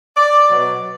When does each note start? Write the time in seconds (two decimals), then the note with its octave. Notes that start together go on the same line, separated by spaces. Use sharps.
0.17 D5
0.50 B2 F#3